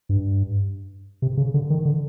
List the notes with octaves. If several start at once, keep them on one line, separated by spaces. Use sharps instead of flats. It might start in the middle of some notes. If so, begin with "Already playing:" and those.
G2
C3
C#3
D3
D#3
D3